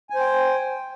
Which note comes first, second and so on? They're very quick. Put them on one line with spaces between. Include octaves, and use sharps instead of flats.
G#5 C5 G5